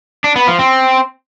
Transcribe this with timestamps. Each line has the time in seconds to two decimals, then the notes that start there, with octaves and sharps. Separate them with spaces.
0.24 D4
0.36 B3
0.47 F3
0.59 C4